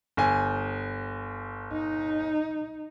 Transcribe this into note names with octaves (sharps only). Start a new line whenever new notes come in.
G1 G#5
D#4